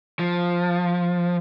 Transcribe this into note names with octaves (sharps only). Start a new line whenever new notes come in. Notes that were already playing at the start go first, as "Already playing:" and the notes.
F3